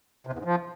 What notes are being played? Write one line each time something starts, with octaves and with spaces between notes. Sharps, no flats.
C3
E2
G#2
F3